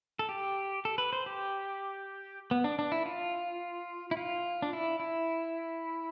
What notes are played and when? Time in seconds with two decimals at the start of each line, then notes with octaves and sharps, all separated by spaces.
0.19 A4
0.29 G4
0.85 A4
0.98 B4
1.13 C5
1.26 G4
2.51 B3
2.64 D4
2.79 D4
2.92 E4
3.06 F4
4.11 E4
4.17 F4
4.62 D4
4.73 E4
5.00 E4